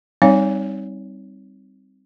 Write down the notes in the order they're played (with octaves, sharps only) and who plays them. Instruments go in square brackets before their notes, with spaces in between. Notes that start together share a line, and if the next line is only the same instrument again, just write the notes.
[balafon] G3 C4 D#4 C#5 F5